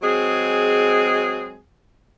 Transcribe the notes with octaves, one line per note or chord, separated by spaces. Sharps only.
F#3 G#3 C4 G#4